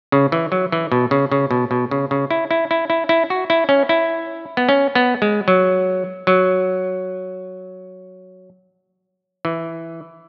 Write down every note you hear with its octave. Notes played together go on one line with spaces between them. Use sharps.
C#3
E3
F#3
E3
B2
C#3
C#3
B2
B2
C#3
C#3
E4
E4
E4
E4
E4
F#4
E4
C#4
E4
B3
C#4
B3
G#3
F#3
F#3
E3